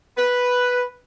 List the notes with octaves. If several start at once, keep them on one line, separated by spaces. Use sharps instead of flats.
B4